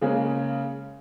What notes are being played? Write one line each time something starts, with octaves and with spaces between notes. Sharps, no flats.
C#3 G#3 A#3 C#4